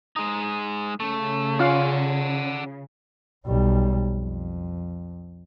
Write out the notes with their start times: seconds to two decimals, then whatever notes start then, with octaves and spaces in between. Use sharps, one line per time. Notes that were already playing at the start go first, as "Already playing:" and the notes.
0.16 G#3 D#4
1.00 C#3 A3
1.59 C#4 F4 D5 F5 F#5
3.46 B1 G3
4.08 F2